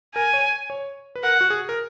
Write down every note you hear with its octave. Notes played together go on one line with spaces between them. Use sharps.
A#4 G#5
C#5
C#5
B4
A#4 F#5
F#4
G#4
A#4